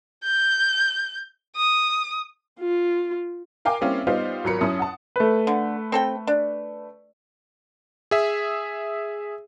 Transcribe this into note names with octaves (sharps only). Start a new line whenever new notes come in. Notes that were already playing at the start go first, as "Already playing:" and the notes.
G6
D#6
F4
A#4 F5 G5 G#5 D6
G3 A#3 C4 C#4 E4 F5
G3 B3 D#4 F4 C5 F5
G#1 F#3 F4 A#4 B5 C#7
F#2 C#4 E4 A5 D#6
F#5 A5
A3 B4
D3
C4 A4 G5
D4
G#4 E5